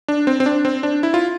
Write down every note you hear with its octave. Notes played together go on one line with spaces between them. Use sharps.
D4
C4
C4
D4
C4
D4
E4
F4